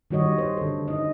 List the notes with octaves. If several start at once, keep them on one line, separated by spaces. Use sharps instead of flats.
D#3 G3 F#4 C#5 D#5
C5
D3 A4
D#4 D#5